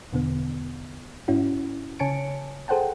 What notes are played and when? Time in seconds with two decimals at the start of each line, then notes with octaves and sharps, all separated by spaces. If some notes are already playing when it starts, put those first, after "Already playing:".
0.13 E2 B2 D3 B3
1.28 G#2 C#4 E4 F#4
1.99 C#3 C#5 G#5 A5 C#7 D7
2.68 G#4 A4 C5 F#5 G5 A5